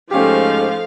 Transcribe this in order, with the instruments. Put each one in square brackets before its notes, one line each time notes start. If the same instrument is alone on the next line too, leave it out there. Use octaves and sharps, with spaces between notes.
[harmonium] G#2 D#4 [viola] F3 A3 [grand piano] C#4 G4 [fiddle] F5